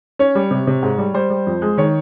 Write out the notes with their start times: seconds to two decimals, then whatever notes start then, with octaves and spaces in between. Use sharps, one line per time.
0.19 C#4 C#5
0.35 G3
0.51 C3
0.67 C3
0.82 G#2
0.98 G3
1.14 G3 C5
1.30 G3
1.47 F2
1.62 G#3
1.78 D#3 C#5